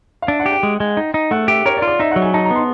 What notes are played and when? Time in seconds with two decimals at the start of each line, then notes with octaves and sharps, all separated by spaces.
0.22 F5
0.28 D4 E5
0.40 F#5
0.46 G4
0.51 G5
0.63 G#3
0.80 G#3
0.97 D#4
1.14 D#4
1.31 A3 F#5
1.48 G4 E5
1.66 A#4 C#5
1.77 D5
1.82 F4
1.87 D5
2.00 D#4 E5
2.11 F#3 F#5
2.22 G#5
2.34 D#4 A5
2.45 A#5
2.50 B3
2.56 C6